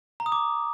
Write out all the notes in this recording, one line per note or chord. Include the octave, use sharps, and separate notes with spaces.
A#5
D#6
D6